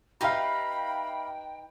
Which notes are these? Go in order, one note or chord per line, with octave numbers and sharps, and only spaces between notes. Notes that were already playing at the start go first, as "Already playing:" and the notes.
D#4 G4 B4 E5 F5 G5 B5